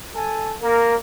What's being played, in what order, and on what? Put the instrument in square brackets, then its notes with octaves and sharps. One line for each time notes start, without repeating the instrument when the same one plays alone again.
[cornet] A4 [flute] G#5
[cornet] A#3 [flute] A#4